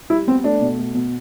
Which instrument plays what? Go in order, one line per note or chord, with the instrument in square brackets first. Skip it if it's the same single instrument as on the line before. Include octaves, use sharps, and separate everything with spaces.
[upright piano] G3 E4
B3 C4
A3 D4
B2
A3
B2